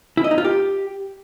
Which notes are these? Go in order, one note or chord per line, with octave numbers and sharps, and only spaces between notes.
E4
D#5
D#4
F4
G4